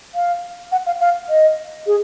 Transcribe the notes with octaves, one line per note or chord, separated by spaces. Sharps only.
F5
F#5
F5
F5
D#5
G#4